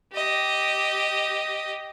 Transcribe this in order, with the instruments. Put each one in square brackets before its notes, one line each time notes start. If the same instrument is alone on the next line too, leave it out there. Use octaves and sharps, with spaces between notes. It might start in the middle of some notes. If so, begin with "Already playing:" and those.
[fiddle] G4 D#5